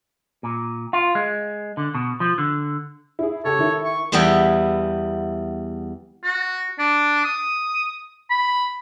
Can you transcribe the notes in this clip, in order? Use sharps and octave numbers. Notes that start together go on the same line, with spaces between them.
A#2
F4
G#3
D3
B2
F3
D3
E4 G#4
C#3 G4 A4 C#5
D#3 E4
C#6
E2 G3 B3 E4 B4 G5
F#4
D4
D#6
B5